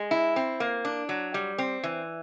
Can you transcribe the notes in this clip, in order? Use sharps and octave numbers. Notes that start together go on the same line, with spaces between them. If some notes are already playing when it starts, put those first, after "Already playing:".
Already playing: G#3
E4
C4
A#3
D4
F#3
G3
C4
E3